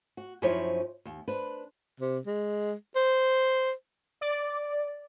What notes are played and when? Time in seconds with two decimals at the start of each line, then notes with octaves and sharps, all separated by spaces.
0.17 F#4
0.42 F#2 F3 D#4 E4 C5 C#5
1.05 D#2
1.28 D4 B4 C5
2.00 C3
2.27 G#3
2.96 C5
4.21 D5